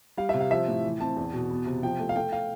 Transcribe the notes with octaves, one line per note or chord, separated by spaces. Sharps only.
G3 F5
C3 E5
F5
F3 E5
A2
E3
C4 A5
E2
B2
B3
C3
F3 G5
A3
F5
A3 G5
F5